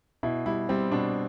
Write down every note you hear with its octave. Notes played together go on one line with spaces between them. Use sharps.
B2 E4
G3 E4
G3 C4
B2 D4